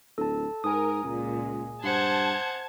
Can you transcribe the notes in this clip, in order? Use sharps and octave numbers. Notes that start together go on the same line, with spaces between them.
D1 A4 A5
G#2 A#4 G#5 D#6
C#2 A#2 G#3
G2 C5 F#5 A5 G#6